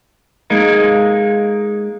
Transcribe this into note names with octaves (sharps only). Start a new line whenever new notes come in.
G#3 A#3 D#4